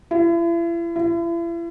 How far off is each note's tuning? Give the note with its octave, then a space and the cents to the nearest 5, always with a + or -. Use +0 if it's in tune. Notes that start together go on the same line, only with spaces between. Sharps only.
E4 +40
E4 +40